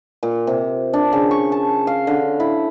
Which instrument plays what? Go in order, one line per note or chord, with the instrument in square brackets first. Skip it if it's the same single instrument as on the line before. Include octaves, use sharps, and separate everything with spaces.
[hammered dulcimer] A#2
C3
D4
C#3
C#6
A5
F5
D3
E4